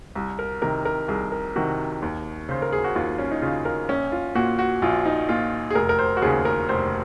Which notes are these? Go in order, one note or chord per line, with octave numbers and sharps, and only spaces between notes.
C2
A#4
C3 D#3 A#4
A#4
C2 G#4
A#4
C3 D#3 F#4
D#2
C#3 C5
A#4
G#4
F#4
D#2 F4
C#4
D#4
C#3 F4
A#4
A#1 C#4
F4
A#2 F#4
F#4
A#1 F4
D#4
A#2 F4
G#4
F1 A#4
A#4
C5
F#4
D#2 C#3 G#4
A#4
F1 C5